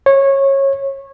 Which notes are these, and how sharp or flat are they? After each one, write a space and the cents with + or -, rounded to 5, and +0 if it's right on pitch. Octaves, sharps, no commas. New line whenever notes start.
C#5 -20